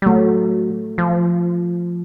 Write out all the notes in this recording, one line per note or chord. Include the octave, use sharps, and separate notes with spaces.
G3
F#3 A3
F3